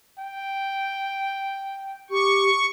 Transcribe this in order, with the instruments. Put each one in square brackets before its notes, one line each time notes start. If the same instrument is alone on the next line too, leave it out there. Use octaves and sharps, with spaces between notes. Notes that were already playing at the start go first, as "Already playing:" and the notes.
[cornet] G5
[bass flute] G4 [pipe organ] C#6